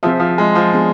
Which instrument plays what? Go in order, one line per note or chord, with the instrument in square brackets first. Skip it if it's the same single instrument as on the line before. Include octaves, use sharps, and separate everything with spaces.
[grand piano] F3 [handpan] C4 G#4 C5 E5
[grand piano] F3
G#3
F3
[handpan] B3 D4 G#4